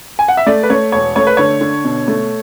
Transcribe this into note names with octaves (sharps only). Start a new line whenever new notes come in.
G#5
F#5
E5
A3 D5
B4
A3 C#5
E1 C#5
A3 C#5
B4
D3 C#5
D3
B2
A3